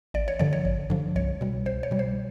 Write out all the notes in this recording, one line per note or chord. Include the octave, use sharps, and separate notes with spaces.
A1 D5
C#5
G2 D3 F3 D5
C#5
A1
G2 D3 F3
C2 C#5
B2 G3
C2 C5
C#5
B2 G3
C5